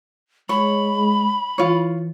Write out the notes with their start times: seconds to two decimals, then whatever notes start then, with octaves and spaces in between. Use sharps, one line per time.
0.49 G#3 C#5 B5
1.58 E3 F4 C#5